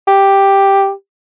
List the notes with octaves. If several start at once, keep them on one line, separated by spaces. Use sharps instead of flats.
G4